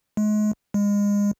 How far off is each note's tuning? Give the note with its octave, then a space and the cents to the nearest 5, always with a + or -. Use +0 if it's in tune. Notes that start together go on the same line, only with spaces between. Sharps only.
G#3 +35
G#3 -30